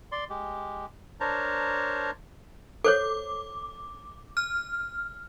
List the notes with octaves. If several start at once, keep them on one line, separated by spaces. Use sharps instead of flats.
D5 C6
G#3 G4
D4 A#4 C5 C#5 A5 A#5
A4 C5 C#5 D6
F6